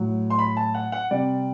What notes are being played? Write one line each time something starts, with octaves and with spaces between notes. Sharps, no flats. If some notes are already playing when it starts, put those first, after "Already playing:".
Already playing: A2 F#3
C6
B5
A5
F#5
F#5
C3 G3 D5